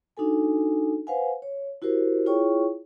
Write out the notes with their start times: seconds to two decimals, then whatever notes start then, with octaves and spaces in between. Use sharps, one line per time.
0.17 D4 D#4 F#4 A4 G#5
1.07 B4 C5 F5 F#5 G#5
1.42 C#5
1.82 E4 F#4 G4 A#4 C5
2.26 E4 F4 G#4 C#5 G5 C#6